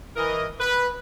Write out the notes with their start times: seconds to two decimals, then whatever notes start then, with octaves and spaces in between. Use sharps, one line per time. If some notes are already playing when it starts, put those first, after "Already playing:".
0.16 E3 A#4 D#5
0.59 B4